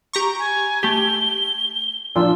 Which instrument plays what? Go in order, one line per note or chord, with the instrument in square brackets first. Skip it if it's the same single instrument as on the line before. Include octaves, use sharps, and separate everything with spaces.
[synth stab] G4 A#5 C#6
[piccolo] G#5
[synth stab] A3 G4 [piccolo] G7
[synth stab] A#2 F3 [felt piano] D4 F4 [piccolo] E6